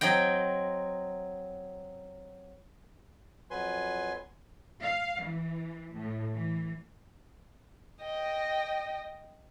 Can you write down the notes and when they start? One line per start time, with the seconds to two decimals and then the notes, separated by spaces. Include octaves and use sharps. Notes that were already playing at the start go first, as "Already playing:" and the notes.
0.01 F#3 C4 D#5 G5
3.51 F2 F#3 B4 G#5 C6
4.82 F5
5.21 E3
5.92 A2
6.33 E3
8.01 D#5 G5